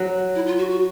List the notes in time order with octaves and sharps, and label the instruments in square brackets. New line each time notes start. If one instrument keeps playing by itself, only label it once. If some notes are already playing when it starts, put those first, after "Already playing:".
Already playing: [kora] F#3
[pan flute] E4
F4
F#4
F#4